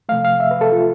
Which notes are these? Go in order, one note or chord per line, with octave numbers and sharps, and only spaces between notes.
C3 F3 A3 F5
F5
E5
B4
A4
F4